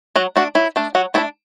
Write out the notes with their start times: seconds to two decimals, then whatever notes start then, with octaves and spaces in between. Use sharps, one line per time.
0.16 F#3 F#4
0.36 A3 D4 F#4
0.55 F#3 E4
0.76 A3 D4
0.95 F#3 F#4
1.14 A3 D4 E4 A4